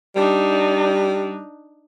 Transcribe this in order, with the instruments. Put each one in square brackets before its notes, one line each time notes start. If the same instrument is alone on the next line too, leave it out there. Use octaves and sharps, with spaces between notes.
[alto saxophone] G3 [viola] D4 D#4